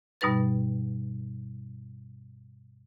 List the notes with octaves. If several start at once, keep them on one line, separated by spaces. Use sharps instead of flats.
G2 B2 G3 D#4 B4 A6